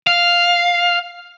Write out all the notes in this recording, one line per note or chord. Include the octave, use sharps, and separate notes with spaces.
F5